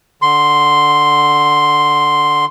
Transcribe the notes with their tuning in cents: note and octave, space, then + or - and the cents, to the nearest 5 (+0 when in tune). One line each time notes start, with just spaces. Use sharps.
D3 +0 C6 +0